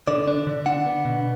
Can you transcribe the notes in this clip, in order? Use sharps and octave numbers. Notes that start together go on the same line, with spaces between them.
D3 D5
D4
D3
D4 F#5
B3
B2